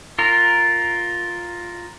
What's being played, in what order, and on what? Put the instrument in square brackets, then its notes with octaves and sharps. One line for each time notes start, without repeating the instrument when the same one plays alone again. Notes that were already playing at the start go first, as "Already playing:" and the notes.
[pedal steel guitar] F4 A#4